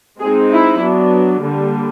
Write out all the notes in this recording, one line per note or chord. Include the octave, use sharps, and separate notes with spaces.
G#3 C4 D#4 G#4
E4
F#3 B3 D4
D3 G3 A#3